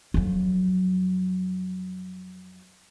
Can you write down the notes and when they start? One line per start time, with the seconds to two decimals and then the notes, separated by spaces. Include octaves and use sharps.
0.14 F2 F#3